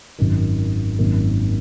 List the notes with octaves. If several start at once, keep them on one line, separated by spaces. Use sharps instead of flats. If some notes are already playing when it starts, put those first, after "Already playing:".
G#1 F#2 D#3
G#1 F#2 D#3 A#3